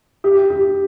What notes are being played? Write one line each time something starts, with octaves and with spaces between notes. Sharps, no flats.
G4
G4